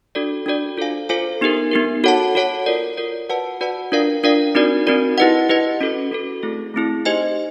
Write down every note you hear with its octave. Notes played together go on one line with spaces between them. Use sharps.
D4 F#4 A4 D5
D4 F#4 A4 D5
F4 A4 C5 F5 G#5
F4 A4 C5 F5 G#5
B3 D#4 G4 A#4
B3 D#4 G4 A#4
F#4 A4 C#5 F#5 A5
F#4 A4 C#5 F#5 A5
F4 A#4 D5
F4 A#4 D5
F#4 B4 D5 F#5 A5
F#4 B4 D5 F#5 A5
D4 F4 A#4 D5 F5
D4 F4 A#4 D5 F5
C4 D#4 F#4 A#4 D5
C4 D#4 F#4 A#4 D5
E4 G4 B4 D#5 F#5
E4 G4 B4 D#5 F#5
C#4 F#4 A4
C#4 F#4 A4
A3 C4 E4 G#4
A3 C4 E4 G#4
D#4 G4 C5 D#5 G#5